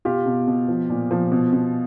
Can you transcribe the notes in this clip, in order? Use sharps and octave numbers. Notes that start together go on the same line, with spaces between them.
B2 F4 G4
B2
B2
F3
A#2
F3
B2
B2